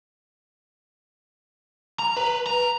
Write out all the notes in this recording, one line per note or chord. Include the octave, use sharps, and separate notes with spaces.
A#5
B4
A#5